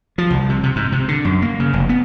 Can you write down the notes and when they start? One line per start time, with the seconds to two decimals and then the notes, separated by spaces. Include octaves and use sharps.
0.18 F3
0.30 C2
0.49 C3
0.63 C3
0.76 G#2
0.92 C3
1.08 D3
1.25 F#2
1.42 A#3
1.60 C#3
1.73 F1
1.89 B3